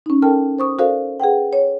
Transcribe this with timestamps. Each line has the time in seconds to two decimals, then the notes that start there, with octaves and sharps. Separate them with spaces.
0.06 C#4 D#4
0.22 A4 A#4 G5 A5 F6
0.59 C5 C#6 D#6
0.79 F#4 A4 A#4 C5 D5 F5
1.20 G#4 B4 F#5 G5
1.53 C#5